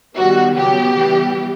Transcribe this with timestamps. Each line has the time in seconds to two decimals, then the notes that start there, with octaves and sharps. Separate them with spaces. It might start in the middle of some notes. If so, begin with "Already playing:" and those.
0.16 D#3 G3 B3 F#4
0.56 C#3 F#3 B3 G4
0.97 E3 G3 B3